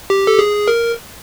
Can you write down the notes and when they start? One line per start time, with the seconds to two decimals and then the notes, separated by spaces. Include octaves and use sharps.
0.10 G4
0.27 A4
0.39 G#4
0.68 A#4